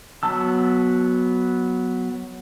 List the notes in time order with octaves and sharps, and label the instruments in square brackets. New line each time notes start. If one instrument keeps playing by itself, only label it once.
[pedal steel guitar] F#3 B3 A5 E6